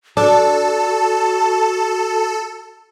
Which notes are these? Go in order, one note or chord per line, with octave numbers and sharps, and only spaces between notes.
D4 F#4 A4 A5